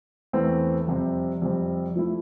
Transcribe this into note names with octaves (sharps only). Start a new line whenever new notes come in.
E2 E3 A3 C4
F2 C3 G3 C4
F2 C3 G3 C4
F3 A3 E4